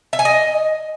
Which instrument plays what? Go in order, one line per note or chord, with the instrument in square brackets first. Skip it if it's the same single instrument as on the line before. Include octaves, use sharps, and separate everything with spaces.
[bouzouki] E5
G#5
D#5